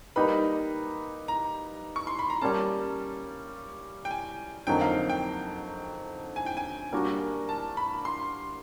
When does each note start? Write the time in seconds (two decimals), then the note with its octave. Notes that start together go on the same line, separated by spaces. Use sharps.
0.16 G3 A#3 D#4 G4 B4 B5
1.28 A#5
1.96 C#6
2.07 C6
2.19 B5
2.30 A#5
2.41 G3 A#3 C#4 A5
4.05 G5
4.11 G#5
4.67 F2 D3 F#3 A#3 D#4 G5
4.81 F5
5.10 G5
6.36 G#5
6.46 G5
6.57 G#5
6.92 G3 A#3 D4 F#4 A#4
7.49 A5
7.77 B5
8.05 C6